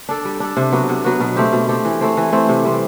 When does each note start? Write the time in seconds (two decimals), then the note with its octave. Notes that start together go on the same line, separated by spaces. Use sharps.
0.09 D4 A4
0.25 G3
0.40 D4 A4
0.57 C3
0.72 F#3 B3 F#4
0.89 C3
1.04 F#3 B3 F#4
1.20 B2
1.36 A3 C4 G4
1.53 B2
1.68 A3 C4 G4
1.85 E3
2.01 A3 C4
2.17 E3
2.32 A3 C4
2.49 C3
2.65 G3 C4